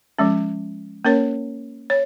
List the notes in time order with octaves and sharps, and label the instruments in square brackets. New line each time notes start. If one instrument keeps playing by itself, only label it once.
[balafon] F3 G#3 C#4
A#3 C#4 A#4 C#5
C#5